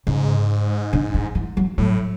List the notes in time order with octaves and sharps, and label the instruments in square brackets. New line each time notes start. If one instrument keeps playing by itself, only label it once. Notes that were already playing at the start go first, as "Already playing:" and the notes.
[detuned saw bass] G#2 [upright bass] C#3
[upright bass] D3
D#3
E3
F#3
[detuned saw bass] A2 [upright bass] F#3